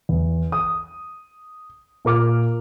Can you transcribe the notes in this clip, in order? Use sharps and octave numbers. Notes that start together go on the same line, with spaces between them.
E2
D#6
A#2 A#4 D6 F6